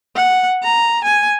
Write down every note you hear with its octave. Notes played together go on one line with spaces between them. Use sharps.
F#5
A#5
G#5